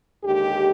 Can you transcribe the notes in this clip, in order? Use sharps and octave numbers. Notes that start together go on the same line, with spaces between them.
D#2 D3 G#3 G4